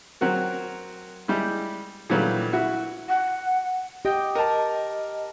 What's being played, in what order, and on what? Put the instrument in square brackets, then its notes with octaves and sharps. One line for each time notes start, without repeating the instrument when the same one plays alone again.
[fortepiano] F#3 C4 F#4 A#4
G3 G#3 E4
A#2 D3 E3 F#3 G3 A3
E4 F#4
[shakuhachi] F#5
[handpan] G4 [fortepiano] D#5 G5
[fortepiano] A#4 A5 [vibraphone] D#5